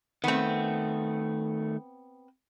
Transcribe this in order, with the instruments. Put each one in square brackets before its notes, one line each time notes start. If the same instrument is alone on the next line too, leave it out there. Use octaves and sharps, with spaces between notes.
[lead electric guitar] D#3 A3 [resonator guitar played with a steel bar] B3 C4